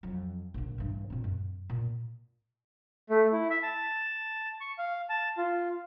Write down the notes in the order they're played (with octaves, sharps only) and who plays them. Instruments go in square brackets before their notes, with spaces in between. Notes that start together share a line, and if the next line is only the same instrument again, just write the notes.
[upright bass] F2 F#3
A#1 D3
G2 E3
A#2 C4
F#2
A#2
[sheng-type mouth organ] A3
E4
E5
A5
C#6
F5
A5
F4